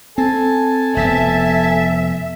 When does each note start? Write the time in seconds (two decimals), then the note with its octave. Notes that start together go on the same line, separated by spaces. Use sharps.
0.18 C4 A4 G#5 A5
0.96 F1 F3 B3 E5